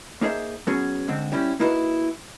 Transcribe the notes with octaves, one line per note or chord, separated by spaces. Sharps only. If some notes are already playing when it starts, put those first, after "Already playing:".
A#3 D#4 G#4 A4 C5 E5
F#3 B3 C#4 F#4 G#4
G#2 D3 C4
G3 C#4 E4 G4
A#3 D#4 E4 F#4 G#4 B4